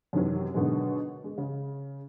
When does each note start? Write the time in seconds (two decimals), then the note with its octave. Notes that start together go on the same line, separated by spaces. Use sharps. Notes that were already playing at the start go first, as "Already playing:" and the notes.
0.13 F#2 C3 D#3 E3 F#3
0.54 B2 D3 D#3 F#3 G#3
1.24 G#3
1.38 C#3